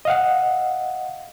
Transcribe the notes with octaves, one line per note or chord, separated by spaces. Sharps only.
D#5 F5 F#5